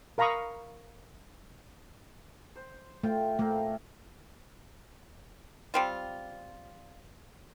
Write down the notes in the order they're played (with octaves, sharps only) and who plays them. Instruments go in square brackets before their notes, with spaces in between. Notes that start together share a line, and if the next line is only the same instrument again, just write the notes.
[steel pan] A#4 F5 A#5 B5 C#6 D#6
[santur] C5
[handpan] A3 [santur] F4 G5
[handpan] A3 [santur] A#3 C4 A#4
[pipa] G3 C4 F4